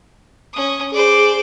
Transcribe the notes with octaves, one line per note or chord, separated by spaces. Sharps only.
C#4 D#6
G#4 C5 D5